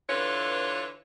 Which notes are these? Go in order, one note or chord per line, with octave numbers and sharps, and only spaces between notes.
D3 E3 F4 B4 C#5